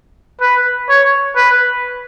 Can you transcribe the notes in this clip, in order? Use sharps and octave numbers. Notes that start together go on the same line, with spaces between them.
B4
C#5
B4